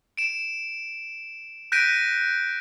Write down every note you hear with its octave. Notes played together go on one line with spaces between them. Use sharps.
D7 E7
F#6 G6 A#6 B6 D7 D#7